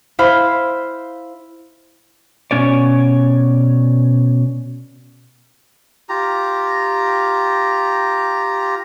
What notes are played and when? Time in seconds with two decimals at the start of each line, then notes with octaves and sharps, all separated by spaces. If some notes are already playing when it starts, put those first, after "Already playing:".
0.19 E4 C5 F5 B5 C6
2.51 B2 F3 C#4 C#5 D5
6.09 F4 G4 A#5